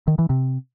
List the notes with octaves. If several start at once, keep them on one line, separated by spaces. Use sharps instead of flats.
D#3
E3
C3